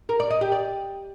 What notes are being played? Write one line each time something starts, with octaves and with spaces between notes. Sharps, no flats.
A#4
D5
D#5
G4
D5